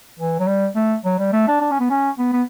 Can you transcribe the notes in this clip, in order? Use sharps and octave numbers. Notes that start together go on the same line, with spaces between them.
E3
F#3
G3
A3
F#3
G3
A3
D4
D4
C#4
B3
C#4
B3
B3